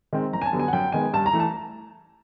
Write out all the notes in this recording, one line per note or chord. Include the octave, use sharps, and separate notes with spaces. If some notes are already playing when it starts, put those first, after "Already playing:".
D#3 G#3 C4
F#1 A#5
G#5
A5
F#2 D3 G3 B3
G#5
F#5
F#2 G5
D#3 G#3 B3 G#5
G2 A5
A#5
E3 A3
A5